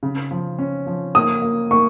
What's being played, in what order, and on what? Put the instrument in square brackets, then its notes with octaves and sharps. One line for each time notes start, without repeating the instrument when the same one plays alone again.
[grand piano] C#3
F3
C#4
F3
[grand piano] A#3 [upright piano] D#6
[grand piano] A#3
[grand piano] A#3 [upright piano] C#6